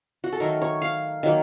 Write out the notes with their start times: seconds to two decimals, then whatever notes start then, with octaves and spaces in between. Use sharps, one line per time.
0.24 F#4
0.33 A4
0.40 D#3 F#3 A3 A#4
0.62 C#5
0.82 F5
1.23 D#3 F#3 A#3